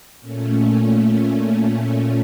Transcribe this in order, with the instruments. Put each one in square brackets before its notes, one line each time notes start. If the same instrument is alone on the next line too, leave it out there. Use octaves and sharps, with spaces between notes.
[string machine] A#2 A3 C#4